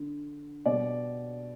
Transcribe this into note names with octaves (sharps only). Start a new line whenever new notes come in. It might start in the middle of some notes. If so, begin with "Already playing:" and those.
Already playing: D3
B2 G3 D5